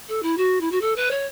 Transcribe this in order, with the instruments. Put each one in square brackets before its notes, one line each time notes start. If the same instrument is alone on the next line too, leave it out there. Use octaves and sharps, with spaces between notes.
[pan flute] A4
E4
F#4
E4
F#4
A4
B4
C#5